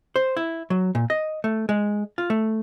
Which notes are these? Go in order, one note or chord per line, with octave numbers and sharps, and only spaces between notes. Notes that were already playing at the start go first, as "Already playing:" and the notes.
C5
E4
F#3
A#2
D#5
A3
G#3
F4
A3